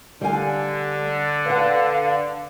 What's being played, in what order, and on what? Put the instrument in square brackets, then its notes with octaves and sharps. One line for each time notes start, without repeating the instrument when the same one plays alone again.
[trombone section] D3 [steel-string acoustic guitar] G3 F5 G#5
[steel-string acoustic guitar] B4 F#5 [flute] F5